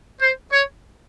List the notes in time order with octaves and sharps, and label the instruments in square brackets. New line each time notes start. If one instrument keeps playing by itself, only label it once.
[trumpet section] C5
C#5